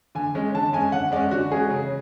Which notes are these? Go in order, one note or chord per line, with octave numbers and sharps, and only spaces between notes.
D3 G#5
G#3 C#4
D3 A5
G#3 C#4 G#5
D3 F#5
G#3 C#4 D5
D3 F#4
G#3 C#4 G#4
C#3